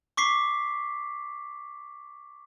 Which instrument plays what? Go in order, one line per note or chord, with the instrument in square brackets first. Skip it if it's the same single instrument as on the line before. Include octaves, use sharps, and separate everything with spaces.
[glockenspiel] C#6 D6 B6 C7